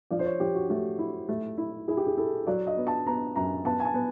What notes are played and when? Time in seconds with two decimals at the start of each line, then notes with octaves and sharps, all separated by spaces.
0.11 F3 D5
0.19 C5
0.25 C#5
0.40 F3 G4
0.55 F#4
0.69 A3 G4
0.98 E4
1.29 A3
1.58 E4
1.88 E4 G#4
1.97 G4
2.07 G#4
2.17 E4 A4
2.47 F#3 D5
2.67 D#5
2.77 B3
2.87 A5
3.07 B3 A#5
3.36 F#2 A#5
3.65 B3 A5
3.80 G#5
3.85 A5
3.94 B3